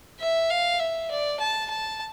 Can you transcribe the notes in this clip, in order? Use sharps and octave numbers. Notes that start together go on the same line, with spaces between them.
E5
F5
E5
D5
A5
A5